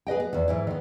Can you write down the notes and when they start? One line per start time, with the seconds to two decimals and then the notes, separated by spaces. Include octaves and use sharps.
0.07 G#4 B4 D#5 G5
0.20 B3
0.33 E2 D#3
0.48 G#2 E3 E4
0.67 D#3 B3